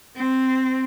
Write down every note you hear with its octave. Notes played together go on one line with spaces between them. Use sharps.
C4